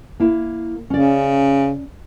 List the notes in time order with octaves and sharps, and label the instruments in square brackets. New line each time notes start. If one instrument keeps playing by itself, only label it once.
[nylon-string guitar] A#3 E4
[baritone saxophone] C#3 [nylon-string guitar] C#4 D5